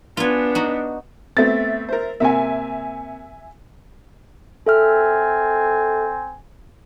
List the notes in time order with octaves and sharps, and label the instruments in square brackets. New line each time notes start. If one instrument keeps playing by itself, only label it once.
[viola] B3 D4 [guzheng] F4 G#5
[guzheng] D#4 F#4
[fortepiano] A3 B3 C4 [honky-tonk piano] E5 A6
[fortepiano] A#4 C5
[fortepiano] C3 A#3 [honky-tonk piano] E5 G#5
[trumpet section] C4 G#5 [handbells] A4 E5 F6